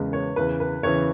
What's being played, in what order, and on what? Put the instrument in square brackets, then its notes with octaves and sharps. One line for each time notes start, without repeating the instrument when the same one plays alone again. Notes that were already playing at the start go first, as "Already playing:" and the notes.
Already playing: [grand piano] E2 C#3 G#3 [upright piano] A#4 B4
[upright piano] C#5
[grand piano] E2 C#3 E3 [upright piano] B4
[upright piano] B4
[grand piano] E2 C#3 E3 [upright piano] C#5